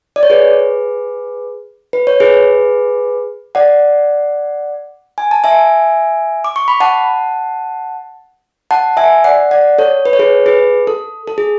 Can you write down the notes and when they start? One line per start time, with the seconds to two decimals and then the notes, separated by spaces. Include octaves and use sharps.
0.16 D5
0.23 C#5
0.30 G#4 B4
1.93 B4
2.07 C#5
2.20 G#4 B4
3.55 D5 F#5
5.18 G#5
5.31 A5
5.44 E5 G#5
6.44 D6
6.56 C#6
6.68 B5
6.80 F#5 A5
8.71 F#5 A5
8.97 E5 G#5
9.24 D5 F#5
9.51 D5 F#5
9.79 A4 C#5
10.06 B4
10.13 C#5
10.19 G#4 B4
10.46 G#4 B4
10.87 A4
11.27 A4
11.38 G#4